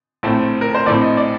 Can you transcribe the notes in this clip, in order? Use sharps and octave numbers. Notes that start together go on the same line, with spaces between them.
A#1 A2 A3 C4
A#4
C5
A#1 A2 A3 C4 D5
D#5
D5